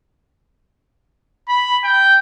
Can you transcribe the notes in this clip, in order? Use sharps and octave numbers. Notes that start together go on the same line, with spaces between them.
B5
G5